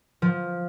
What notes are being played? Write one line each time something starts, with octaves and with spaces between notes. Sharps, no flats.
F3